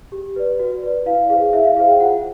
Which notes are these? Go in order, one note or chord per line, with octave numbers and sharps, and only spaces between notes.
G4
B4 D5
F#4
B4 D5
E4 F5
G#4 C5 F5
E4 E5
F5
G#4 C5 F5
G5
F4 F#5